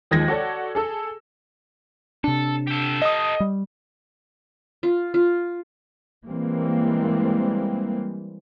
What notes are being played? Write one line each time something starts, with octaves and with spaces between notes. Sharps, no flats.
D#2 D#3 F3 G#3 G#6 A#6
F#4 A4 C#5 D5
G#4 A4 E6
C3 D4 A4
G4 A4
D#5 D#6
G3
F4
F4
E3 G3 G#3 A#3 C4